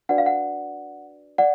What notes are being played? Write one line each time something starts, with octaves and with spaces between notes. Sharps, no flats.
D4 F#4 B4 D5 F#5
F5
F#5
D5 F#5